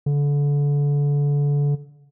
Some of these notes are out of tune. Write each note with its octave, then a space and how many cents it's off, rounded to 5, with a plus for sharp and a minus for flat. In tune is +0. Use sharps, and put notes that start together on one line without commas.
D3 -30